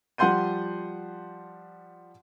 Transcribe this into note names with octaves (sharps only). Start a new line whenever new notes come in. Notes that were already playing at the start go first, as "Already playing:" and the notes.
F3 G3 F#5 C6 G6 D#7